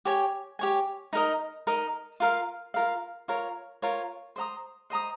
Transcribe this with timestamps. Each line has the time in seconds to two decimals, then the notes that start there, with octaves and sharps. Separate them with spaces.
0.05 G4 C#5 G#5
0.59 G4 C#5 G#5
1.13 D#4 A#4 D#5
1.67 D#4 A#4 D#5
2.20 F4 A#4 F5
2.74 F4 A#4 F5
3.28 F4 A#4 C#5
3.82 F4 A#4 C#5
4.36 C5 D#5 A#5 D#6
4.90 C5 D#5 A#5 D#6